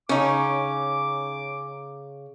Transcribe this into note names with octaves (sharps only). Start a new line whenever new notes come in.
C#3 C#4 D#4 D6